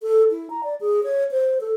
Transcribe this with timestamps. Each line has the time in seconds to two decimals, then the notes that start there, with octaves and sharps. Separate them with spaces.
0.02 A4
0.31 E4
0.50 A#5
0.63 D5
0.81 G#4
1.04 C#5
1.31 C5
1.61 A4